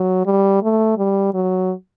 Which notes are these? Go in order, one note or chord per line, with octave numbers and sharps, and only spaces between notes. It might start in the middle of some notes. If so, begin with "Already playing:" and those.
Already playing: F#3
G3
A3
G3
F#3